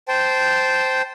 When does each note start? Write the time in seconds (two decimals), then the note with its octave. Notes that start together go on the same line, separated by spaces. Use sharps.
0.08 C5 G5 A5